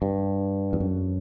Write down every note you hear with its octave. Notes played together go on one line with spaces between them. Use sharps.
G2
E2
F#2